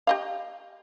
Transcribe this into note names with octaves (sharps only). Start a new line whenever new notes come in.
G4 D#5 F5